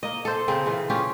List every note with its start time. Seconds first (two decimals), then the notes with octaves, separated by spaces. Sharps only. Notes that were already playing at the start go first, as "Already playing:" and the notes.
0.03 A#3 D#5
0.25 A4 C5
0.48 C#3 C4 G#4 A#4
0.66 C#3 E3 F4
0.90 C#4 F4 G4